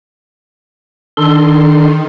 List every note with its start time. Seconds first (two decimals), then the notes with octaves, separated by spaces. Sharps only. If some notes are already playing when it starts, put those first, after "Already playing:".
1.17 D#3 D4 A4 C6